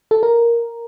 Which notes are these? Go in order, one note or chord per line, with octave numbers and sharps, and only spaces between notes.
A4
A#4